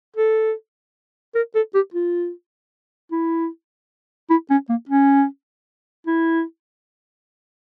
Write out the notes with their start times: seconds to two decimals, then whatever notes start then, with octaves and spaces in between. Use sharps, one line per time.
0.16 A4
1.35 A#4
1.55 A4
1.74 G4
1.94 F4
3.12 E4
4.30 E4
4.50 C#4
4.69 A#3
4.89 C#4
6.07 E4